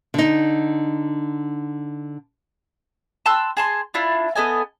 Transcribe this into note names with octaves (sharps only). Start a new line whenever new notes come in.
D3 D#4
A5 C6 E6 F#6
G#4 A5 C6
D4 E4 F4
B3 A4 D#5 G#5